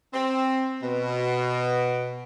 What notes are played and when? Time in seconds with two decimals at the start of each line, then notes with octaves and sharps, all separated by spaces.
0.13 C4
0.83 B2